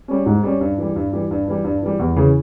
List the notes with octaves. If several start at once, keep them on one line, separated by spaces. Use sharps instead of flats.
G3 C#4
G#2
G3 C#4
G2
E3 G3
G2
E3 G3
G2
E3 G3
G2
E3 G3
E2
C#3 E3